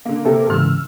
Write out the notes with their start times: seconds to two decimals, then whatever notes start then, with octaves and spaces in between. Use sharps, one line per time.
0.05 D3 A#3
0.25 C3 A#3 G4 A4 A#4 E5
0.50 G#2 C#3 E3 E6 F6